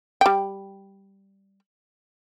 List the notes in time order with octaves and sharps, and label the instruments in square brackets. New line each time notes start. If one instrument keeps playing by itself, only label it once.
[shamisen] G3 G5